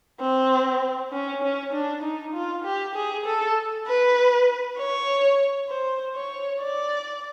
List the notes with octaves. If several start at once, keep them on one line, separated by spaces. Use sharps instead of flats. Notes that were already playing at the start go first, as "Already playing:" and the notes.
C4
C#4
C#4
D4
D#4
F4
G4
G#4
A4
B4
C#5
C5
C#5
D5